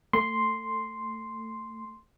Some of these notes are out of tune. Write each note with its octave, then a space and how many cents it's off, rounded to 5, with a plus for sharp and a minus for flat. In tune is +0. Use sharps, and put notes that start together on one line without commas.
A3 +25 C6 +0